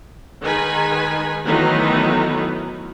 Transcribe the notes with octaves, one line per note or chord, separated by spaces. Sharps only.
D#3 G#3 D#4 B4 G#5
D#3 E3 F#3 A3 B3 D#4